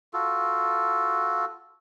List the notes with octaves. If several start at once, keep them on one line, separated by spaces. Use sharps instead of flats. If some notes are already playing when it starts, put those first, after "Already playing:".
F4 F#4 A4